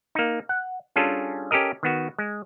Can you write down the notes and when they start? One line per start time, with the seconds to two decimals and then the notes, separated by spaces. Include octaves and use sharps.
0.15 A#3 D#4
0.49 F#5
0.96 G3 C#4 D4 F4 G#4 A4
1.51 C#4 G4 A4 A#4 D#5
1.83 D#3 B3 F#4
2.18 G#3